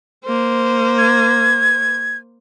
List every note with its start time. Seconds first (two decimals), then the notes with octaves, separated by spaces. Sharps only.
0.25 A#3 C5
0.98 G#6